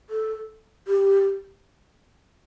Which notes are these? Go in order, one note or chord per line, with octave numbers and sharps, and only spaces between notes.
A4
G4